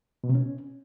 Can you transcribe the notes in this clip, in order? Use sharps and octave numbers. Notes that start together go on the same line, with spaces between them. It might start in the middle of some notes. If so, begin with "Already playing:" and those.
B2
C3
C#4